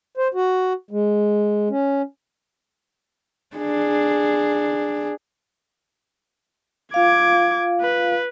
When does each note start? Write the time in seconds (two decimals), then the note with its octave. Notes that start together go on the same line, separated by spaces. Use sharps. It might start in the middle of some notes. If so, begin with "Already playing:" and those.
0.17 C5
0.34 F#4
0.91 G#3
1.70 C#4
3.56 D4 G#4
6.94 F4 F5 D6 G#6
7.81 B4